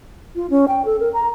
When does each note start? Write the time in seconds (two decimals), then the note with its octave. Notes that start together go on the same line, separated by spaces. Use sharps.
0.36 F4
0.50 C#4
0.68 G5
0.85 A4
1.00 A#4
1.14 A#5